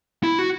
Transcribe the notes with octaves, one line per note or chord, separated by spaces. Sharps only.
E4
F#4